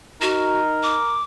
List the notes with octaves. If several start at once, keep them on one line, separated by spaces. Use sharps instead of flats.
D#4 F#4 A#4
D6